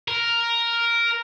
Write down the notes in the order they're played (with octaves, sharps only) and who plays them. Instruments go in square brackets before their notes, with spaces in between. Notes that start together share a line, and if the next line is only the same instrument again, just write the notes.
[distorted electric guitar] A#4